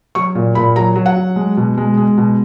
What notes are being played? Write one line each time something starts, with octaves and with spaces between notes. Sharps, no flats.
F#3 C#6
A#2
A#2 B5
F#3 A#5
F#3
F#5
F#3
G#3
B2
G#3
G#3
B2